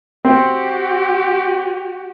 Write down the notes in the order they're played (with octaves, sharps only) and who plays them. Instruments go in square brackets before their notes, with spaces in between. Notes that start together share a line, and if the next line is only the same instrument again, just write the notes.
[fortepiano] C4 [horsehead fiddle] F#4 G4